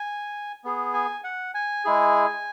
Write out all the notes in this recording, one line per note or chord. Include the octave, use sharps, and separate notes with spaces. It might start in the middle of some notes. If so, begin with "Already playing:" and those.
Already playing: G#5
B3 G#4
G#5
F#5
G#5
G#3 E4 G#4